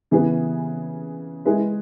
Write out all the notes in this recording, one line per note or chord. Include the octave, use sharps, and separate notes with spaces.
C#3 E3 B3 G#4 B4
G#3 E4 G#4 B4